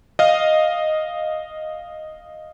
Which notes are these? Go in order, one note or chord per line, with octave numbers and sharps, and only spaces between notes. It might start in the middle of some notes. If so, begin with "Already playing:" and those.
D#5 F5